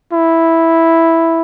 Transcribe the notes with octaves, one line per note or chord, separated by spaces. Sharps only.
E4